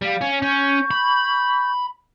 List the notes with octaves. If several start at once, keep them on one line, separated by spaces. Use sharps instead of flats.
G3 F5
C#4
C#4 C#6 G6
B5